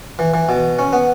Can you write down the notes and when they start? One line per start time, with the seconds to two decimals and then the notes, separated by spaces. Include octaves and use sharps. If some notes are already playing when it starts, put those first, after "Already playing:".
0.19 E3
0.34 E3
0.49 B2
0.79 C#4
0.93 B3